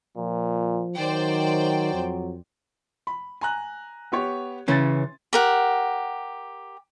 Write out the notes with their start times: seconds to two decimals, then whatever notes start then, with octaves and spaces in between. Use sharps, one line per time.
0.17 A#2 F3
0.98 D#3 F#3 C5 D5 G5
1.94 F2
3.07 B5
3.41 G#5 A#5 F#6
4.12 B3 G4 C#5
4.68 C#3 E3 C#4 C6 A6
5.33 G4 A#4 F#5